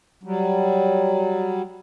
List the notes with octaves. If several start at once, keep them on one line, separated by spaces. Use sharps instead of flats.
F#3 G3